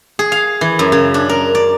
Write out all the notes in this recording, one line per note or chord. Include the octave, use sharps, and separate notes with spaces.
G#4
F5
E3
F#2
C#3
D4
A#4
D5